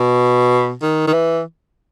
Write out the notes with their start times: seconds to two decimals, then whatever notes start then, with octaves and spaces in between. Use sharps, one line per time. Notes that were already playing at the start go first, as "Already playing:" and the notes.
Already playing: B2
0.82 D#3
1.07 D#3
1.13 E3